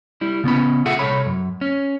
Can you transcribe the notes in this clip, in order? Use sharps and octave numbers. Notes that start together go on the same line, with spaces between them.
G3 E4
C#3 B3 C#4 B5
F4 G#4 A4 E5 F#5
C2 A4 C#5 B5
F#2
C#4